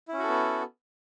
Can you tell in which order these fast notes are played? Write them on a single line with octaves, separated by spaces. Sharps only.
E4 C#4 F#4 A4 B3